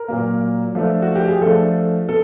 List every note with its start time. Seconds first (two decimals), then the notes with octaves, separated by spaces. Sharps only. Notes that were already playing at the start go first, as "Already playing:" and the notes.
Already playing: A#4
0.08 A#2 F#3 A#3
0.75 F3 A3 D4
1.02 F#4
1.15 G4
1.28 G#4
1.41 F3 A3 D4 A4
2.08 B2 A4